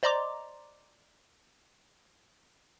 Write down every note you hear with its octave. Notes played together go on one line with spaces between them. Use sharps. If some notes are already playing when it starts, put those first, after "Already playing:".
C5 D5 D#5 A#5 C6 D6